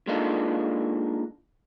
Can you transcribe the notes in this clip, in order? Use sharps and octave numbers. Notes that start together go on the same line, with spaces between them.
G#3 A#3 D4 D#4 F4 A4